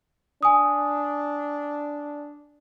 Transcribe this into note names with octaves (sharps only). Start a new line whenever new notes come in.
D4 G#5 D#6